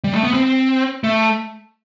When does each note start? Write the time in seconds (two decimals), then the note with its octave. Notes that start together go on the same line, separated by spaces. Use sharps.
0.04 G3
0.14 A3
0.24 B3
0.34 C4
1.04 A3